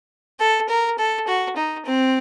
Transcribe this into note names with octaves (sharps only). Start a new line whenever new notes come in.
A4
A#4
A4
F#4
D#4
C4